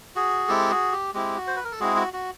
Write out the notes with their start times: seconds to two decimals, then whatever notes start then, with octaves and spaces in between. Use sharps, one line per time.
0.16 F#4 G#4
0.48 G#3 C4 E4 G4 A4
0.70 F#4 G#4
0.92 G4
1.14 G#3 C4 E4 G4
1.37 F#4
1.47 C5
1.56 B4
1.65 A#4
1.72 A4
1.80 G#3 C4 E4 F#4 G#4
1.96 F#4
2.13 F#4